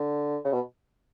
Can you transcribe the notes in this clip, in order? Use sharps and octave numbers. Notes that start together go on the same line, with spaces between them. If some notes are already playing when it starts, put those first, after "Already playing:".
Already playing: D3
C#3
B2